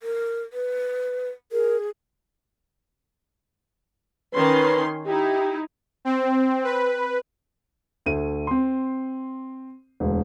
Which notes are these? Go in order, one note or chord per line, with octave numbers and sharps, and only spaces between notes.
A#4
B4
G#4 A#4
D#3 C#4 B4 C6
D#4 E4 G4
C4
B4
D2 A3 D#7
C4 C6
E1 D2